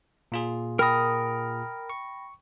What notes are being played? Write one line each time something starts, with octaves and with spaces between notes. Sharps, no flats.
A#2 F4 G#4
A#4 G5 B5 D#6 A#6
C#6